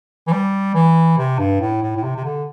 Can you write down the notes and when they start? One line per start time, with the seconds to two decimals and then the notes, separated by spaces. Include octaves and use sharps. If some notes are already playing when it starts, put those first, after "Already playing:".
0.27 E3
0.32 G3
0.75 E3
1.18 C3
1.38 G2
1.60 A2
1.82 A2
1.96 A2
2.03 C3
2.16 C3
2.24 D3